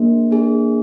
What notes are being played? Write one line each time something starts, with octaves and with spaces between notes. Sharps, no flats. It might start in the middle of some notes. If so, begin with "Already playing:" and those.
Already playing: A#3 D4 G#4
A#3 D4 G#4